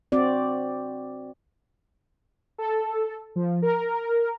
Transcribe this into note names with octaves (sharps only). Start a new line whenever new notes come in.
C4 F#4 D5
A4
F3
A#4